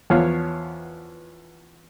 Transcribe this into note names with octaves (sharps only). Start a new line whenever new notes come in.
E2 F3 B3 C#5 F5